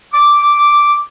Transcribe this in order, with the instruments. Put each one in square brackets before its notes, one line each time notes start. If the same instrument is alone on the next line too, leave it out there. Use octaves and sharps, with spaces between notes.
[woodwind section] D6